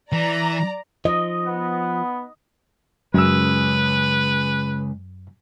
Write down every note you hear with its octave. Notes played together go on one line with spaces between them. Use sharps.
E3 D5 A#5
F3 D#5
B3
F#2 C#3 G#3 B4 E6